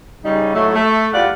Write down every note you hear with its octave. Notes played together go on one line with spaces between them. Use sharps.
C#3 G3 D#4
A2 F#3 A3
A3
E2 G3 F4 D5 F5 F#5